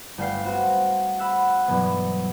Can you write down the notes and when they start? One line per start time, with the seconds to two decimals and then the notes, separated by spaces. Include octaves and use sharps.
0.18 G1 A3 F5 G5 C7
0.43 B3 C4 F#4
1.19 F#5 B5 E6 F#6
1.68 G2 B2 E3 F#3 B3